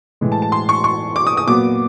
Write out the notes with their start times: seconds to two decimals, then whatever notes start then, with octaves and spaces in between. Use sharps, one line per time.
0.21 A2 E3 G#3
0.32 A5
0.42 A5
0.52 C6
0.69 C#6
0.84 C#6
1.16 D6
1.27 D#6
1.37 D#6
1.47 A#2 F#3 B3 D6